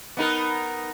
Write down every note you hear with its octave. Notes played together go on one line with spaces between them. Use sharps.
B3 D#4 A#4